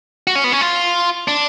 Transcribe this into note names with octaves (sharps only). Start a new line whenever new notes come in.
F#4
C#4
B3
C#4
F4
D4